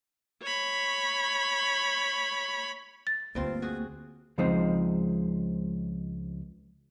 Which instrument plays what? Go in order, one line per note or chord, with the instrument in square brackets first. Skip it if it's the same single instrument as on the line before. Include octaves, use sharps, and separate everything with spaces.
[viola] C#5 B5
[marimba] A6
[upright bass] D2 [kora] G2 C4 F4 [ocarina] A#3
[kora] F#4 G#4
[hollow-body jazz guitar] C#2 F3 G#3 C4 D#4 C5